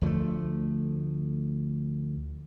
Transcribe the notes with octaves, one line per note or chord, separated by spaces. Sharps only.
D2 F3 F#3 A3